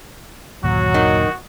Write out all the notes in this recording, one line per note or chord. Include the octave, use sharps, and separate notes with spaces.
G1 D#2 A#2 F#3 F#4
D#3